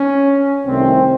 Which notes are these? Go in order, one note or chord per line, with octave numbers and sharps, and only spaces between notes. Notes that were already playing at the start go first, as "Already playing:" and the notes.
Already playing: C#4
C2 C3 D#3 A3 C4